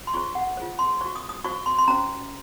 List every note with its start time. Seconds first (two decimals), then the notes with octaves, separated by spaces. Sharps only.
0.07 C6
0.14 F4 G#4 C5 C#6
0.35 F#5
0.57 F4 G#4 C5
0.79 C6
1.01 F#4 C5 C#6
1.16 D#6
1.29 D#6
1.44 F#4 C5 C#6
1.66 C6
1.78 C6
1.88 C#4 F#4 C5 A#5